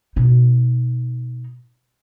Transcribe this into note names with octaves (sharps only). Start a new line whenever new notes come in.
B2 D#4